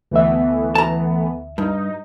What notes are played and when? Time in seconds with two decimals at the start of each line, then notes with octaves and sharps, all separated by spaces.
0.12 D2 E3 A3 B3 E5
0.75 A5 A#5
1.58 G2 D#4